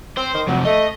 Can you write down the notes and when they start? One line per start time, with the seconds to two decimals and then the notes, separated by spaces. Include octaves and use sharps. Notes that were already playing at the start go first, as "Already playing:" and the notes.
0.18 C4 C5
0.34 D#3
0.48 F2 C3 F#3
0.65 A3 D#5